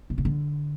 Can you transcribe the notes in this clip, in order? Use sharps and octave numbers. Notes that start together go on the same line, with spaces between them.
B2
C#3
D3